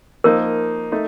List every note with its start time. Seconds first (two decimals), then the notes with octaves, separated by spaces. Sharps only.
0.24 F3 A#3 D#4 A#4
0.92 A3 D#4